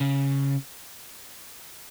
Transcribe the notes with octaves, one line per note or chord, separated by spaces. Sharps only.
C#3